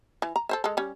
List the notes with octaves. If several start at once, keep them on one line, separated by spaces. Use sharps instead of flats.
E3
A#5
A4 C5 E5
G#3 A4
G3 C#4